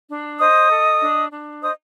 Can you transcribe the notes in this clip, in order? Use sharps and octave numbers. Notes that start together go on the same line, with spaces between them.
D4
C5 D#5 D#6
A4
D4
D4
C5 D#5 D#6